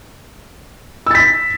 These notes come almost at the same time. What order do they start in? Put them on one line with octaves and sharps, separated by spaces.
E6 A6 B6